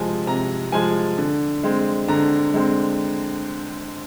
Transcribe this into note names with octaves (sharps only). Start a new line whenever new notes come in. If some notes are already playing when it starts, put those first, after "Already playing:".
Already playing: C3 F3 G#3 G#5
C3 A#5
F3 G#3 G#5
D3
G#3 C4
D3 A#5
G#3 C4